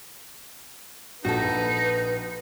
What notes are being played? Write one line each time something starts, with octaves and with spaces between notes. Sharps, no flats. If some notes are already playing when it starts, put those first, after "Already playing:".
A#1 D#4 F#4 A4 B4